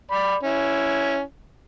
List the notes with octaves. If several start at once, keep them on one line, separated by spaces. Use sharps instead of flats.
D5 B5
C#4 E4